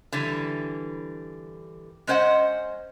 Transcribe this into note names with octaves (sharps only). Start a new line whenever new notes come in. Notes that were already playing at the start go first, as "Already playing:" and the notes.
D3 E3 G3
G#3 C#4 C5 D#5 F#5